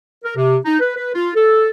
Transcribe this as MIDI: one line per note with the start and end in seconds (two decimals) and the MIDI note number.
0.24 0.35 70
0.36 0.57 48
0.64 0.77 63
0.80 0.96 71
0.96 1.09 71
1.14 1.31 65
1.35 1.70 69